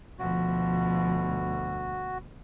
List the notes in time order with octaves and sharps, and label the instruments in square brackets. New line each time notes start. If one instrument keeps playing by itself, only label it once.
[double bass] D2 B2 [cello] F3 [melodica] F#4